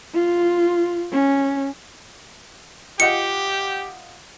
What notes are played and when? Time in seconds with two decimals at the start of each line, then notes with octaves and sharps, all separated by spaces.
0.14 F4
1.12 C#4
3.00 F4 G4 D#5 F#5 C#7